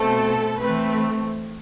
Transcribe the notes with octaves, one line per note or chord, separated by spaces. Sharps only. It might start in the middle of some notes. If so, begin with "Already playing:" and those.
Already playing: B2 A3 C4 A4
E3 A3 C4 B4